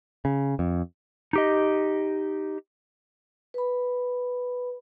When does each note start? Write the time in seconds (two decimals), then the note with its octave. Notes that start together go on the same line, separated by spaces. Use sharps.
0.25 C#3
0.59 F2
1.33 D#4 G4 D#5
3.54 B4 B5